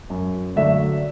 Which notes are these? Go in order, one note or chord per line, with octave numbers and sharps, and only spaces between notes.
F#2
D3 F#3 A3 D4 E5